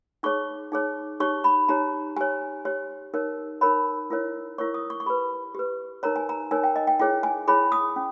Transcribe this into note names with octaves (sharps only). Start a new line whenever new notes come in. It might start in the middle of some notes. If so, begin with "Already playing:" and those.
D#4 G#4 C#5 C#6
D#4 G#4 C#5
D#4 G4 C#5 C#6
B5
D#4 G4 C#5 A#5
G4 C#5 G#5
G4 C#5
D#4 A#4 C#5
D#4 A#4 C#5 B5
E4 A#4 C#5
E4 A#4 C#5 C#6
D#6
C#6
C#6
G4 B4 B5
G4 B4
D#4 A#4 C#5 A#5
G#5
A#5
D#4 A#4 C#5 G#5
G5
D#5
G5
E4 G#4 C#5 G5
G#5
E4 G#4 C#5 B5
D#6
C#4